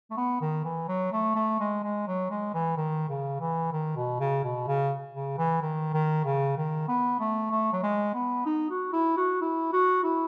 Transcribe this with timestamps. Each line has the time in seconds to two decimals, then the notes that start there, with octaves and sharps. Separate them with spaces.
0.11 A3
0.17 B3
0.41 D#3
0.65 E3
0.89 F#3
1.12 A3
1.35 A3
1.60 G#3
1.83 G#3
2.07 F#3
2.30 G#3
2.54 E3
2.77 D#3
3.09 C#3
3.41 E3
3.72 D#3
3.96 B2
4.20 C#3
4.44 B2
4.67 C#3
5.15 C#3
5.38 E3
5.62 D#3
5.94 D#3
6.25 C#3
6.57 D#3
6.88 B3
7.20 A3
7.51 A3
7.73 F#3
7.83 G#3
8.14 B3
8.46 D#4
8.70 F#4
8.93 E4
9.17 F#4
9.41 E4
9.73 F#4
10.04 E4